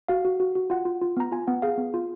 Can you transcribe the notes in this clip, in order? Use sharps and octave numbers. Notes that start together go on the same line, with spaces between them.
F#4 F5
F#4
F#4
F#4
F4 F#5
F4
F4
B3 A#5
F4 G#5
B3 F#5
G#4 F5
B3
F4